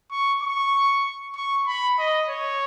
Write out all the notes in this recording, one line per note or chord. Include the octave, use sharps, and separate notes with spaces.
C#6
C#6
C#6
B5
D#5
C#5